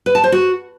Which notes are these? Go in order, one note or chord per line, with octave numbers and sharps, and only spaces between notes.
B4
A5
C5
F#4